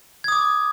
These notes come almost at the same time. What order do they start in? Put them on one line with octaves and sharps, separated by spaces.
G#6 D#6 D6